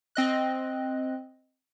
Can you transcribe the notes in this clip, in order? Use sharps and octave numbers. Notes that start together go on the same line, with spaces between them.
C4 D#5 F#6